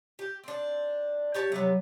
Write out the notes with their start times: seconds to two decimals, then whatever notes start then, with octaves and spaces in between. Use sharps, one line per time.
0.19 G4
0.43 C4 D4
1.34 G4 C#5 A5
1.52 C3 F#3 B3